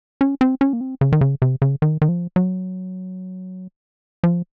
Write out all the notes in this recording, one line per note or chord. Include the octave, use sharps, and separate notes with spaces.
C#4
C4
C#4
A#3
C4
C#3
D#3
C#3
C3
C#3
D#3
D#3
F3
F#3
F3